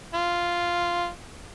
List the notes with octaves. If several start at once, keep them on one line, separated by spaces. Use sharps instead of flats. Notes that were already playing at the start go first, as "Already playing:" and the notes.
F4